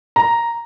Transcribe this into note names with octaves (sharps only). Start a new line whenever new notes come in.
A#5